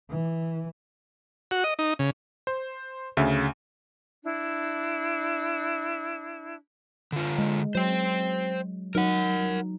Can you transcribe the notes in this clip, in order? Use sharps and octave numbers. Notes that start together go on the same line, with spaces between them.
E3
F#4
D#5
D#4
C#3
C5
D2 C#3 E5
D4 E4
D3 F4
G#3
F#3 C5 G5
F#3 D#4 A#4 F#5